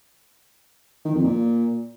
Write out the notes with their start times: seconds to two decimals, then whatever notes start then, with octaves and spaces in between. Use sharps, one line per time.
1.05 D#3
1.15 F2
1.24 A#2